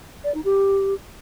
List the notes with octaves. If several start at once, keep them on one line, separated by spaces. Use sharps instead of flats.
D5
D#4
G4